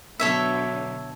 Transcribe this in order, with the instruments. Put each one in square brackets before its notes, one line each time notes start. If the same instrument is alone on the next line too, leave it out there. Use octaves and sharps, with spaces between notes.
[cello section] B2 D3 F#3 [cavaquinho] A4 C#5 E5